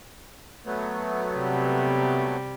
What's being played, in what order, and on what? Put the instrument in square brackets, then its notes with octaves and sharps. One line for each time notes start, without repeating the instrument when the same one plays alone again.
[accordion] F#3 A3 B3
[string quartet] C3 G3